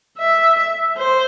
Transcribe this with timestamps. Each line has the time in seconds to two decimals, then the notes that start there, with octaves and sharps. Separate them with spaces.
0.19 E5
0.98 C5